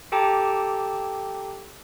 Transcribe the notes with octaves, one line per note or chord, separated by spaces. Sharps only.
G4 A4 G5 A5 A#5 D6